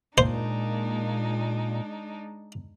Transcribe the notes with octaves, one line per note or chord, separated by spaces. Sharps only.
A#2 G#3 D4 D#4 C5